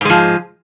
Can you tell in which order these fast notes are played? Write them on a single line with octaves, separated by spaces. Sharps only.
G#2 G#3 F3